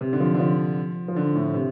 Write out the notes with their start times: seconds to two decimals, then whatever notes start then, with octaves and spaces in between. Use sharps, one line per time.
0.01 C3
0.13 D3
0.20 F3
0.34 D3
0.39 F3
1.08 F3
1.16 D3
1.35 A2
1.54 C3